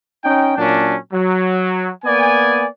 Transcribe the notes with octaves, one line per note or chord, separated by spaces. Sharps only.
C#4 D#4 G5
A#2 F#3 C#4 D4
F#3
A#3 B3 D5 G#5